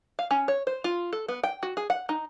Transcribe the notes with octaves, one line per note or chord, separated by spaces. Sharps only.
F5
C#4
C#5
C5
F4
A4
B3
G5
F#4
G#4
F#5
D#4